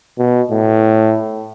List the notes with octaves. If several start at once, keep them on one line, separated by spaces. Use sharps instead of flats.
B2
A2